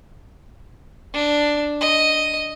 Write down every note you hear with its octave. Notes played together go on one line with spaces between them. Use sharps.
D4
D#5